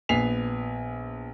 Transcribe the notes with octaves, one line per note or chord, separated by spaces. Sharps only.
A#1 B3 G#5 B6 C7 F7